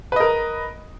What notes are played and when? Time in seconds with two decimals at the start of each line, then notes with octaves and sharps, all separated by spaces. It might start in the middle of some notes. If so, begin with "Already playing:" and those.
0.12 B4
0.16 D#5
0.20 A#4